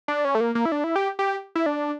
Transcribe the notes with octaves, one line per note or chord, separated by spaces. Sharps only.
D4
C#4
A3
A#3
A#3
E4
D4
E4
G4
G4
E4
D4